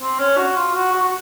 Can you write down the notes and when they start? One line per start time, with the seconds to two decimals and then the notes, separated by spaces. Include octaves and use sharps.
0.01 C4
0.19 C#4
0.37 F#4
0.56 F4
0.75 F#4
0.92 F#4
1.03 F#4